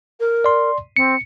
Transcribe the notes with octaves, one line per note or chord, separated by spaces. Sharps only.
A#4
D5 C6
C4 C#7